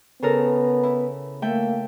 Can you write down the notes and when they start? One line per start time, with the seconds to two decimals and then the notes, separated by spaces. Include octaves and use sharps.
0.22 C#3 B3 A4 A#4
0.83 E4
1.42 A3 A#3 E5 G5